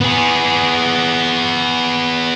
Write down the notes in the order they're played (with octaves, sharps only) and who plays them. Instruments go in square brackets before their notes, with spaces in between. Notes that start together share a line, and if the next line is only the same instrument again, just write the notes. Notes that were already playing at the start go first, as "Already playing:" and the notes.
[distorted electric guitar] B3 G#4